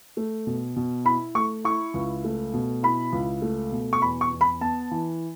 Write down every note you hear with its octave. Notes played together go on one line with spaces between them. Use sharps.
A3
B2
B2
E4 B5
A3 C#6
E4 C#6
C#2
A3
B2
E4 B5
C#2
A3
B2
C#6
E2 B5
C#6
E2
B5
B3 A5
E3